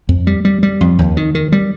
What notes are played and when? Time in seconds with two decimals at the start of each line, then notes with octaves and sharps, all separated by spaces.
0.09 F2
0.27 G3
0.45 G3
0.63 G3
0.81 F2
0.99 D#2
1.17 D#3
1.35 D#3
1.52 G3